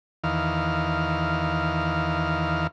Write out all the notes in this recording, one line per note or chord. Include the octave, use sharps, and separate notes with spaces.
E2 D#3 F5